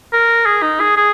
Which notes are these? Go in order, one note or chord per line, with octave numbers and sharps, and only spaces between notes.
A#4
G#4
D#4
G#4
G#4